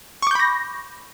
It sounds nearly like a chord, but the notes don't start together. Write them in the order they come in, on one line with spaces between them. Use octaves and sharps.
C#6 D6 G6 B5 A#6